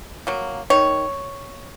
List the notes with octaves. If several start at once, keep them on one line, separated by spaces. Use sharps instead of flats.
F#3 A#3
D#3 C#5